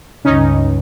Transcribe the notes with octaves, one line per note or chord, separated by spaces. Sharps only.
C#2 G2 C#4 D#4